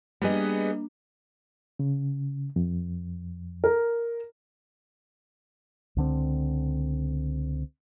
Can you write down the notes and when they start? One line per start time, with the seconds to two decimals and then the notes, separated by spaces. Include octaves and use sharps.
0.22 G3 A#3 B3 D4 G#4 B4 D#5
1.79 C#3
2.56 F2
3.64 A#4
5.96 C#2 D3 C4